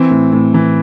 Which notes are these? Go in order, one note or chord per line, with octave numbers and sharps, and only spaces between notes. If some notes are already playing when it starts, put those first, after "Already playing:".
Already playing: E3 C4
A2
A2
E3